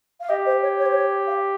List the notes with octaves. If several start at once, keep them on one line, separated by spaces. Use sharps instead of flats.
F5
G4 D#5
C5
C#5
C#5
C5
C#5
F5